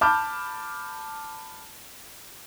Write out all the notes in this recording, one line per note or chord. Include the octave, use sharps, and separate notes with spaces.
A5 B5 D6 F6 G6